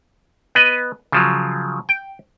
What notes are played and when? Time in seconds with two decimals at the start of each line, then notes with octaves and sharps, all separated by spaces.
0.55 B3 B4 D#5
1.12 C#3 F3 F#3
1.89 G5